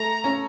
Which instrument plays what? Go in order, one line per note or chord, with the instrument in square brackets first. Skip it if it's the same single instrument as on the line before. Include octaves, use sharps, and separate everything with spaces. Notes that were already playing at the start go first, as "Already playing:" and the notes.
Already playing: [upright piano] A3 [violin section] A#5
[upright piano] C#4